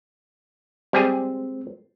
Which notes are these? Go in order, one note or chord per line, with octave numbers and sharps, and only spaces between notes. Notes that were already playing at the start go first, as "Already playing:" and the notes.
G3 G#3 C4 G4 G#4